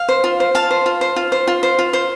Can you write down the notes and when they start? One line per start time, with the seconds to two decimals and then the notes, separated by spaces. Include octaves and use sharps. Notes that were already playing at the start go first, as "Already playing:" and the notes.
Already playing: F5
0.09 C5
0.24 F4
0.40 C5
0.55 F4 F5 A5
0.71 C5
0.86 F4
1.01 C5
1.16 F4
1.32 C5
1.47 F4
1.63 C5
1.79 F4
1.93 C5